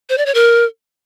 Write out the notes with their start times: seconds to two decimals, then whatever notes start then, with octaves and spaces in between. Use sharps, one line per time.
0.09 C5
0.18 D5
0.26 C#5
0.35 A#4